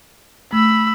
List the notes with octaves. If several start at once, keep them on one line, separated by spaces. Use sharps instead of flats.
A3 B5 E6